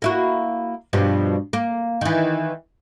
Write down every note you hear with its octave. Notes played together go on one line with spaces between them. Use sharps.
A#3 E4 F#4
G2 B2 F3
A#3
D#3 E3